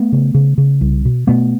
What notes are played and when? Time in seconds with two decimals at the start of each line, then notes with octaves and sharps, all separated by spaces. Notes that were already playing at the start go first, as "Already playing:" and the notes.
Already playing: A3 B3
0.12 C#3
0.34 C#3
0.58 C#3
0.81 C2
1.05 B2
1.27 B2 A3 B3